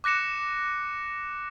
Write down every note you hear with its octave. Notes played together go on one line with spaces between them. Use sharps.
D6 F#6 A#6 C#7 E7